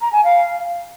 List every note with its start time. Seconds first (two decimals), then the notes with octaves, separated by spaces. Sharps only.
0.01 A#5
0.13 G#5
0.24 F5